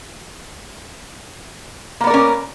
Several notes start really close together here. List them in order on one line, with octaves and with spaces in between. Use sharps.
A#3 B3 D5 A#4 C#4